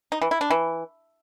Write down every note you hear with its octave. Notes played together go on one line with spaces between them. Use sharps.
D#4
E3
E4
D4
E3